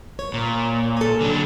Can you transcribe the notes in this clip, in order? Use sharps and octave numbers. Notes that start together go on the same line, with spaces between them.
C#5
A#2
A4 G#5
D3 F#3 D4